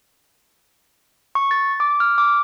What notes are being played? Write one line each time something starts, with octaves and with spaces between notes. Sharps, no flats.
C#6
A6
D6
F6
D6